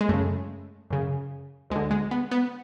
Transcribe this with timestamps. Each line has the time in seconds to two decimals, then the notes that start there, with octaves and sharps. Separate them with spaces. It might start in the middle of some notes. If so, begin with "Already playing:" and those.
0.01 G#3
0.09 F#2 C#3 A3
0.91 F#2 C#3
1.70 D2 G#3
1.76 D3
1.91 G#3
2.11 B3
2.31 B3